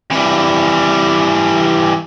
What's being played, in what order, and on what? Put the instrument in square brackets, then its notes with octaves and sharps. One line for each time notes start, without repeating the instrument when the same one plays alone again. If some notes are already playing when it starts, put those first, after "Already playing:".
[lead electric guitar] E3 G3 [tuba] C4